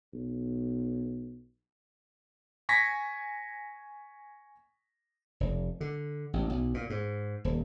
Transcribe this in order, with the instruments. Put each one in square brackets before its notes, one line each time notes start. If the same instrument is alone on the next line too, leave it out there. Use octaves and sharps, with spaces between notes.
[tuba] B1
[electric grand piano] G#5 C#6 G#6 A#6 B6
[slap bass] F1
D3
A1
B1
A#2
G#2
D#1